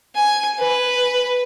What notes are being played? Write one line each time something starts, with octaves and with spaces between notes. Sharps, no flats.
G#5
B4